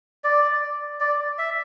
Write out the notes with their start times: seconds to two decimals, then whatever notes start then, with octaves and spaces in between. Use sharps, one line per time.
0.24 D5
1.00 D5
1.38 E5